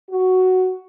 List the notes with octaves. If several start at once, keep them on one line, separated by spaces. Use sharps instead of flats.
F#4